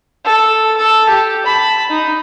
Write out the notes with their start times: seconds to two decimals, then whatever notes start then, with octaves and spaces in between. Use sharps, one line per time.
0.25 A4
0.77 A4
1.09 G4
1.45 A5 B5
1.89 D#4